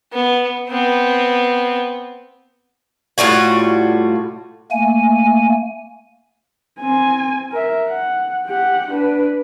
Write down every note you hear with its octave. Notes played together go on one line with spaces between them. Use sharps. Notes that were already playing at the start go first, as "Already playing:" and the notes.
B3
B3 C4
A2 G3 F4 F#4
A3 A#3 G#5
C4 G#5
A#4 E5
F#5
G4 F#5
D4 B4